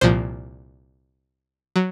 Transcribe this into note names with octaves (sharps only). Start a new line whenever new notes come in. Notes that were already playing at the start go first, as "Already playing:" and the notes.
C2 A#2 F3 C5
F#3